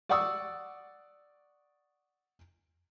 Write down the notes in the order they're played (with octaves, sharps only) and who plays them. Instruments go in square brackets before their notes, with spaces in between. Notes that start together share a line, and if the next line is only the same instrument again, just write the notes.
[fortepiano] D5 F#5 C#6 D#6 E6